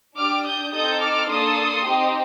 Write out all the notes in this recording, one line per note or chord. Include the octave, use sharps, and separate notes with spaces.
D4 G4 D6 F6
D#6 G6
C4 D#4 A4 D#6 G6
D6 F6
A#3 D4 A4 C6 D#6
C4 D#4 G4